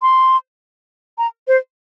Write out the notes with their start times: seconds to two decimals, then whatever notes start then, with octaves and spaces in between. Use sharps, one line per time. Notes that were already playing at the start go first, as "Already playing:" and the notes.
0.02 C6
1.18 A#5
1.48 C5